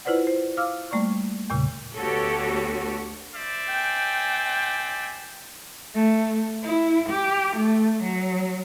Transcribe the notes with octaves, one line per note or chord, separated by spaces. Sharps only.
E4 F4 B4 C5 D5 F#5
C5
F5 D6 E6 F6
G3 A3 A#3 D5 C#6
E2 A#2 C#3
D2 B3 F#4 G4 A4 C#5
C5 D5 E5
G5 G#5
A3
E4
G4
A3
F#3